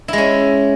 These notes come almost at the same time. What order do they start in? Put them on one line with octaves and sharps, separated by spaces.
E4 G#3 C#4